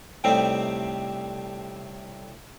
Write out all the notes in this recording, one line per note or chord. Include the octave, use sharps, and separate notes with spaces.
A2 C3 G3 A3 C4 D#4